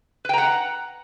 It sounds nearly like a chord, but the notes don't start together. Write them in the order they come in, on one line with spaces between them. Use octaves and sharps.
B4 G5 A#5 F#5